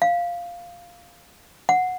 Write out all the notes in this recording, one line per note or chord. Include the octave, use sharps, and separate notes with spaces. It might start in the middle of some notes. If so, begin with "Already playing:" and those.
F5
F#5